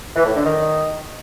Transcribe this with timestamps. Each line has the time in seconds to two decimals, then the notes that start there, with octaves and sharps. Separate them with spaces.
0.16 E3
0.26 A2
0.35 D3
0.45 D#3